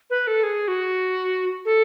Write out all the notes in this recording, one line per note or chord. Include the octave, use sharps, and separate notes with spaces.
B4
A4
G#4
F#4
A4